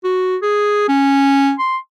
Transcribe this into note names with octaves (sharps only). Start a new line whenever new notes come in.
F#4
G#4
C#4
C6